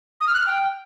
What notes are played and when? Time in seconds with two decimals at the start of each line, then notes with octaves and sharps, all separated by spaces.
0.21 D#6
0.27 F6
0.34 F#6
0.40 F6
0.46 G5